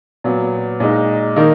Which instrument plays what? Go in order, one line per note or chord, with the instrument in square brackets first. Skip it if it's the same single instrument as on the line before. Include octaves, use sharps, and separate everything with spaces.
[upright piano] A#2 F#3 B3
A#2 G#3 D#4
D#3 A#3 D#4 A#4